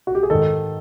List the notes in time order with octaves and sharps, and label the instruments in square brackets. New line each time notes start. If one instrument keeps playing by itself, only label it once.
[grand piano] F#4
G4
G#4
G#2 D#3 A4